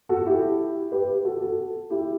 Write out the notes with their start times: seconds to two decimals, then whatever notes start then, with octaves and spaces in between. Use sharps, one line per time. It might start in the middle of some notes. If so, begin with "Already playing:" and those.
0.09 F#4 A4
0.26 E4 G4
0.92 G4 B4
1.25 F#4 A4
1.41 F#4 A4
1.90 E4 G4